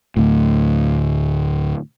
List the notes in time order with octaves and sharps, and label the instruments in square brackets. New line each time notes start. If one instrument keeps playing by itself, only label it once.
[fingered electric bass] D2 A2